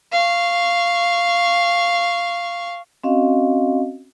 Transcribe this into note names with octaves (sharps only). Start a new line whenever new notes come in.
F5 C#6
C4 C#4 F#4 D#5 F5